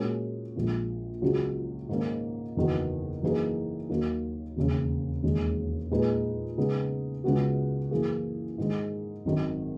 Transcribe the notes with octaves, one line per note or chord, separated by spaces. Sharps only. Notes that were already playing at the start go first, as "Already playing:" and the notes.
Already playing: A#2 G#3 C#4 F#4 A#4
A#1 A#2 G#3
C#2 C#3 F#3
G#2 D#3 A#3 C#4
F#1 E2 D#3 F#3 B3
F#2 E3 A#3 D#4 G#4
D#2 D#3 F#3 A#3
E1 D#2 C#3
E1 D#2 D#3 G#3 C#4
A#2 G#3 D#4 G#4 B4
C#3 G#3 B3 D#4 G#4
C#2 C#3 G#3 B3 F#4
F#2 E3 A#3 E4 G#4
G#2 D#3 G#3
G#1 F#2 D#3